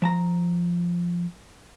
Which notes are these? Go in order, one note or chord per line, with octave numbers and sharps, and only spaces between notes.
F3 A5 A#5